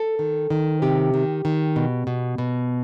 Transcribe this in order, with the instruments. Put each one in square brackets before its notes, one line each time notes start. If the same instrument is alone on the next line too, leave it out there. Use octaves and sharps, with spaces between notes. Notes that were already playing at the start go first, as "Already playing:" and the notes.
Already playing: [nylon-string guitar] A4
D#3
D#3
C3 G4
D#3
D#3
B2
B2
B2